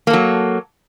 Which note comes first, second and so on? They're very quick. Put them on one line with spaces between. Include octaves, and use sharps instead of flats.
A#3 A4 F#3